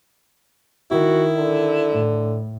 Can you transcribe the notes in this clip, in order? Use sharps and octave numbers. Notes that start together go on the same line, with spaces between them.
D#3 E4 F#4
D3
A2